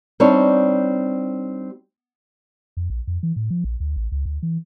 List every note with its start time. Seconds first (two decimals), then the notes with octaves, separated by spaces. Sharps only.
0.20 G3 C4 D4 D#4 C#5
2.77 F2
2.90 A#1
3.07 F2
3.23 E3
3.36 A2
3.50 F3
3.64 A#1
3.80 D2
3.96 A1
4.12 C#2
4.25 D2
4.43 E3